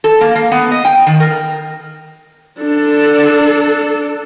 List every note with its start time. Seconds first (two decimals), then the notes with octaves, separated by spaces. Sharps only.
0.04 A4
0.21 A#3
0.35 A#3
0.52 B3
0.72 D#5
0.85 G5
1.07 D#3
1.20 A#4
2.61 D4 A4